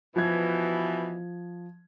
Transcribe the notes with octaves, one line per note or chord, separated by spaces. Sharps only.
B2 E3 F3 G#6